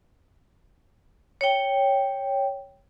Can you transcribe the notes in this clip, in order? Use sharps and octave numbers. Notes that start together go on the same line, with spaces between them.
C#5 G5